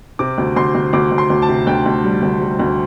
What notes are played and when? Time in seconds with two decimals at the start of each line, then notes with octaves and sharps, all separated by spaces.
0.19 C3 D6
0.38 D2
0.56 D2 C6
0.75 D2
0.93 D2 D6
1.12 D2
1.18 C6
1.30 D2
1.42 A5
1.49 C3
1.67 D2 G5
1.86 D2
2.04 G3
2.22 D2
2.41 G3
2.59 D2